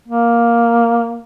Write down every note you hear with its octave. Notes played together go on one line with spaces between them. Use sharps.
A#3